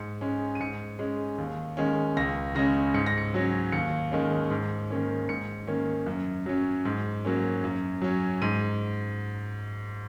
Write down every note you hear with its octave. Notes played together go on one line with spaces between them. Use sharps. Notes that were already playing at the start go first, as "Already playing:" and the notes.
Already playing: G#2 C#7
G#3 C#4
D#7
G#2 C#7
G#3 C#4
D#2
D#3 G#3 C#4
C#2 A#6
C#3 G#3 C#4 A#6
G#2 C#7
A#6
C#7
F#3 C#4
D#2 C#7
D#3 G#3 C#4
G#2
D#3 A#3 C#4
G#2 C#7
D#3 A#3 C#4
F#2
F#3 C#4
G#2
F#3 A#3 C#4
F#2
F#3 C#4
G#2 D#7